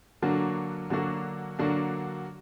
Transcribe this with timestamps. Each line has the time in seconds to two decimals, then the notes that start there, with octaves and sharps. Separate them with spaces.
0.22 D3 F#3 A#3 D4 F#4
0.90 D3 F#3 A#3 D4 F#4
1.59 D3 F#3 A#3 D4 F#4